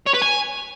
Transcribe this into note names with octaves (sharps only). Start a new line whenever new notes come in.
C#5
B4
G#5